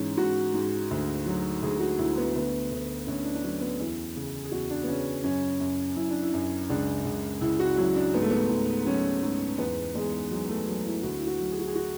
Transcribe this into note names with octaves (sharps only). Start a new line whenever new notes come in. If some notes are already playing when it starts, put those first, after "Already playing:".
Already playing: G#2 E3 C#4
G#2 F#4
G#2
D2
F#3
D2 G#4
F#4
D2 E4
B3
D2 B3
D2
D2 C#4
D4
D4
F#3 C#4
B3
E2 E4
C#3
G#4
E2 F#4
D4
B3
C#3 C#4
F#2 C#4
F#2
F#2 E4
D4
E4
F#2
C#2 D4
C#2
C#2 E4
F#4
F#3 E4
D4
G#2 B3
A3
B3
G#2
F#3 C#4
G#2
E2 B3
E2 G#3
F#3 G#3
A3
F#3
E4
D2 F#4
E4
F#4
F#3
G#4
F#4
G#4
F#4